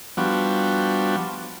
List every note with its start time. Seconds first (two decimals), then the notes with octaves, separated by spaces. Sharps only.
0.17 F3 G3 B3 D4 F#4